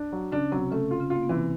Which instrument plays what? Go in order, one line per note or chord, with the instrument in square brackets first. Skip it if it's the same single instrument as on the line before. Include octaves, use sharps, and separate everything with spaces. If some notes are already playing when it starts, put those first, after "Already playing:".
Already playing: [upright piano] D4
F#3
[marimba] C#3 C#4 [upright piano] D4
[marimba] C3 C4 [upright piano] F#3
[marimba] C#3 C#4 [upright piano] A3
[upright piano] F4
[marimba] C#3 C#4
[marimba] A#3 [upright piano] F4
[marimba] B3
[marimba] C3 C4 [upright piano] E3